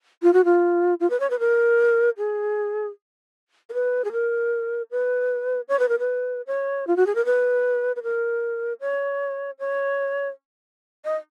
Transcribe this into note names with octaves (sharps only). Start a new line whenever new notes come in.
F4
F#4
F4
F4
B4
C#5
B4
A#4
G#4
A#4
B4
G#4
A#4
B4
C#5
B4
A#4
B4
C#5
F4
F#4
G#4
A#4
B4
B4
A#4
C#5
C#5
D#5